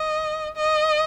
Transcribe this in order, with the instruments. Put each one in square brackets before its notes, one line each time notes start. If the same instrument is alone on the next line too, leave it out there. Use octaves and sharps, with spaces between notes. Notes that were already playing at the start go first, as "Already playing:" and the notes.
Already playing: [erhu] D#5
D#5